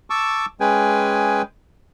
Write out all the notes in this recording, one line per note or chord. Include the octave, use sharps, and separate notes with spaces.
A5 C#6 D6 E6
G#3 C#4 G#4 B4 G5 G#5